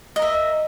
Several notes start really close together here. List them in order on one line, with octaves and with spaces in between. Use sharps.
D#5 A#4 E5